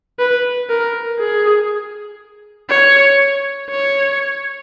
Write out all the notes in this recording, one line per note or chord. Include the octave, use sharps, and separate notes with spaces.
B4
A#4
G#4
C#5
C#5